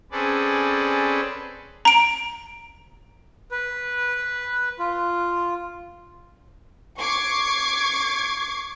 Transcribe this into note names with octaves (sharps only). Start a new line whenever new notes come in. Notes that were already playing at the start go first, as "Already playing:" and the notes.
C4 C#4 G#4 A4 B4 D5
A#5 D7
B4
F4
C#6 D6 G#6 C7